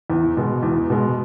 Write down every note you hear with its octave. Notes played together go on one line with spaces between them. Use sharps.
E2
B2 G#3
E2
B2 G#3